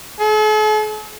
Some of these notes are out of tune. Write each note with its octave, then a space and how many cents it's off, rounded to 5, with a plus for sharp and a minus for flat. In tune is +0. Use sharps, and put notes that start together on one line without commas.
A4 -45